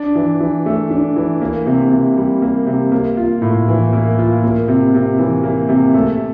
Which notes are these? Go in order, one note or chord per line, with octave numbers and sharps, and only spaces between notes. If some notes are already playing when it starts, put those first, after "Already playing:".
Already playing: D4
E3
E3
A3
D4
E3
A#3
C3
C3
G3
A#3
C3
A#3
F4
A2
E3
A#3
F4
A#3
C3
C3
E3
A#3
C3
A3